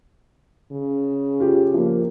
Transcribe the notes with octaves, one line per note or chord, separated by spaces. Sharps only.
C#3
F4 G4
F3 A#3